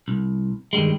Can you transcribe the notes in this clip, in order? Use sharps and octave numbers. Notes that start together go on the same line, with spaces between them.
C2
G2 D#3 G3 G#3